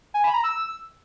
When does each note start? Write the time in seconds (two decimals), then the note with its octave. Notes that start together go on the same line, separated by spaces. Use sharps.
0.14 G#5
0.24 B5
0.34 A#5
0.44 E6